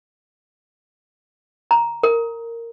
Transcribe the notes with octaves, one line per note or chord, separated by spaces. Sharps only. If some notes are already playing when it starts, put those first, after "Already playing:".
A#5
A#4